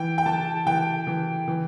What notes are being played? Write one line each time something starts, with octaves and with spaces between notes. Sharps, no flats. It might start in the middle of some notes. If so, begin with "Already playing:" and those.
Already playing: E3 G5
G5
E3 A5
E3 G5
E3
E3